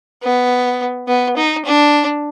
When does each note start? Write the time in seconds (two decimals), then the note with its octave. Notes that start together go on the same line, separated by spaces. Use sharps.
0.23 B3
1.08 B3
1.37 D#4
1.65 D4